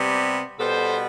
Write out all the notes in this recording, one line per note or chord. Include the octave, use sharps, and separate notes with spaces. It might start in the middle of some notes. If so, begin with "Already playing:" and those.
Already playing: C3 G3 B3
B2 G3 B3 A4 C5